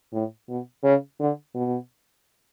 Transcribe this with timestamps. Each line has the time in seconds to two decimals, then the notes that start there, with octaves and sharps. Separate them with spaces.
0.13 A2
0.49 B2
0.84 C#3
1.20 D3
1.55 B2